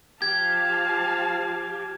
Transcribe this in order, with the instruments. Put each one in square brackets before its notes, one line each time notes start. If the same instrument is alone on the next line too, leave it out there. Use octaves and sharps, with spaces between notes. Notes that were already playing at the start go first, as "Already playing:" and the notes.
[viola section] F3 F5 A5 [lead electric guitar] G4 [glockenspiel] G#6